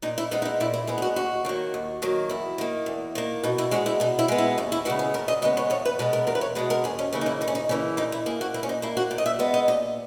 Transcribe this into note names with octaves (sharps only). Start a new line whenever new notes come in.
A#2 D#4
E4
G#3 B3 D#4
D#4
E4
A#2 E4
E4
G#3 B3 E4
G#4
F#4
D#2 F#4
D#3 F#3 A#3
D#2
D#3 F#3 A#3
E2 E4
D#3 A#3
E2
D#3 A#3
B2 D#4
E4
G#3 B3 F#4
E4
B2 D#4
E4
G#3 B3
E4
D#2 D#4
E4
C#3 G#3 B3 F#4
G#4
D#2 A#4
D#5
C#3 G#3 B3 D#5
C#5
E2 C#5
B4
B2 G#3 B3 B4
A#4
E2 A#4
B4
C#5
B2 G#3 B3 B4
A#4
D#2 G#4
C#4
C#3 E3 A#3 C#4
D#4
E4
D#2 D#4
C#4
D#4
C#3 E3 A#3 C#4
A#2 D#4
E4
A#3 G#4
F#4
A#2 E4
C#4
D#4
A#3 E4
F#4
A#2
D#5
E5
G#3 B3 D#5
D#5
A#2 D#5